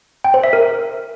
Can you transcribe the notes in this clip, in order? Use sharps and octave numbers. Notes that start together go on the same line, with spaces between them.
G5
C5
E5
A#4